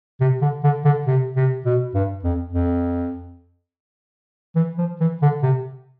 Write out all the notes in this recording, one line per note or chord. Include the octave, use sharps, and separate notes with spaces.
C3
D3
D3
D3
C3
C3
B2
G2
F2
F2
E3
F3
E3
D3
C3